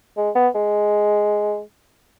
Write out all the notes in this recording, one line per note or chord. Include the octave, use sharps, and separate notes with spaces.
G#3
B3
G#3